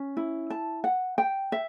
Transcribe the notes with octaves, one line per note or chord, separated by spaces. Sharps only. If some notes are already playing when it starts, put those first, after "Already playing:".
Already playing: C#4
E4
A5
F#5
G5
E5